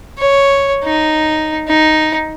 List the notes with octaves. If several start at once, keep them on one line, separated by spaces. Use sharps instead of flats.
C#5
D#4
D#4